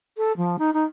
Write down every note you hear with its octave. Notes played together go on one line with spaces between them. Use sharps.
A4
F3
D#4
D#4